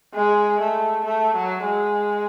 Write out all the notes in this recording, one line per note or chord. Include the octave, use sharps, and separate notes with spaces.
G#3
A3
A3
F#3
G#3